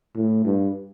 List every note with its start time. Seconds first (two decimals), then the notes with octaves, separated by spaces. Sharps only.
0.15 A2
0.45 G2